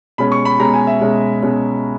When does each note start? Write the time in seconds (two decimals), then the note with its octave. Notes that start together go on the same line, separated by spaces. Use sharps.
0.18 B2 G#3 C#4 B5
0.32 C#6
0.45 B5
0.59 B2 G#3 C#4 A#5
0.74 G#5
0.87 E5
1.01 B2 G#3 C#4
1.42 B2 G#3 C#4